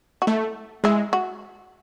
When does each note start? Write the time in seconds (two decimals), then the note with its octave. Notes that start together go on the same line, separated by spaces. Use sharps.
0.22 F#4
0.27 A3 E4
0.84 G#3 E4
1.13 F#4